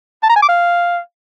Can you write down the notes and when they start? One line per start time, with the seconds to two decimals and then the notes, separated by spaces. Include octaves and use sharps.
0.23 A5
0.29 A#5
0.36 G#5
0.42 D6
0.49 F5